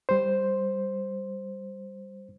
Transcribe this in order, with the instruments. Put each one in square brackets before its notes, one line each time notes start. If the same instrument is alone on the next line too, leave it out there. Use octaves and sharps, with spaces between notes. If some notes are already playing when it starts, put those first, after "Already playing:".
[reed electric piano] G3 C5